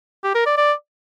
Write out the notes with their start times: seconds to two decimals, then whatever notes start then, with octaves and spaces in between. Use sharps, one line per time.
0.24 G4
0.35 A#4
0.46 D5
0.57 D5